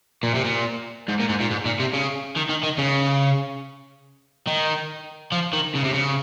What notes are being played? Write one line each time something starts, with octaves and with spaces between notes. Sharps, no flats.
A#2
C3
A#2
G#2
A#2
G#2
A#2
G#2
A#2
C3
C#3
D#3
D#3
D#3
C#3
D#3
F3
D#3
C#3
C3
C#3